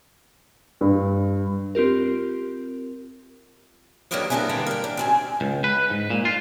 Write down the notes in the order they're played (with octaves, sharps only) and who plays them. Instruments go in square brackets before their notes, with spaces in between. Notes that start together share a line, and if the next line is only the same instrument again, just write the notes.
[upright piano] G2
[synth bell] C4 F4 G4 A#4
[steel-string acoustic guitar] D3 D#3 F#3 G3 A#3 B3
G3 A#3 B3 D4 E4 G#4
D3 G3 A#3 B3 D4
A#4 G5
D4
F#2 C4 G#5
[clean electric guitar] C#2
B4
G#2
A#2
F4